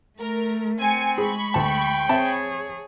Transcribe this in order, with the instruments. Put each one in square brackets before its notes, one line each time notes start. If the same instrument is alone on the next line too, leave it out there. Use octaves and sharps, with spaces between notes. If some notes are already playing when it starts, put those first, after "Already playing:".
[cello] A3 [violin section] A#4
[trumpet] C4 [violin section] G#5 C#7
[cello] G#3 [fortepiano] G#4 [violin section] B5 C#6
[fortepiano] D2 A5 [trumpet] G5
[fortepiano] C4 E5 A5 [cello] G#4 C#5